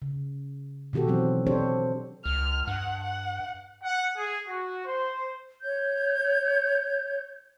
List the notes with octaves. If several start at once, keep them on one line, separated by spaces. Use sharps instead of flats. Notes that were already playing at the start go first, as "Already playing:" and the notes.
C#3
B2 D#3 F#4 G4 A4
E3 F#3 C4
C4 D4 G4 A4 C5 C#5
C#2 F6
G2 F#5
F#5
F#5
G#4
F#4
C5
C#5 G6